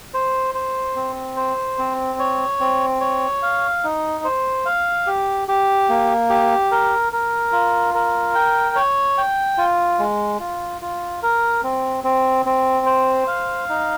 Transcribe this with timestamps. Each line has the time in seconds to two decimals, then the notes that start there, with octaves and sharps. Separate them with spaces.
0.14 C5
0.55 C5
0.96 C4
1.36 C5
1.78 C4
2.19 C#5
2.60 C4
3.01 C#5
3.42 F5
3.84 D#4
4.24 C5
4.65 F5
5.07 G4
5.48 G4
5.89 A#3
6.30 G4
6.71 A#4
7.12 A#4
7.52 F4
7.94 A#4
8.35 G5
8.76 C#5
9.18 G5
9.58 F4
9.99 G#3
10.40 F4
10.81 F4
11.22 A#4
11.64 C4
12.04 C4
12.45 C4
12.86 C5
13.27 F5
13.69 D#4